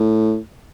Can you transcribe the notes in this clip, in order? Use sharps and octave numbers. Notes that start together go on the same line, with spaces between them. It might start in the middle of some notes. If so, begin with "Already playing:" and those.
Already playing: A2